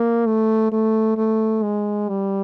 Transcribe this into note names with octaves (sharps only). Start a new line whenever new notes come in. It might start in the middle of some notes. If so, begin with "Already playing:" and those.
Already playing: A#3
A3
A3
A3
G#3
G3